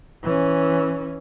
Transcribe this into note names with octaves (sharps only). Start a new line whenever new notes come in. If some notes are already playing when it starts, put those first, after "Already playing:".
E3 C#4